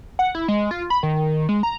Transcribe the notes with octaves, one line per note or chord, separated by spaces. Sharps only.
F#5
E4
G#3
F4
B5
D#3
G#3
A#5